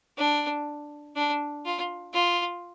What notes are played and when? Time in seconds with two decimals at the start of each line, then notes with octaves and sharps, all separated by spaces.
0.18 D4
1.16 D4
1.65 F4
2.14 F4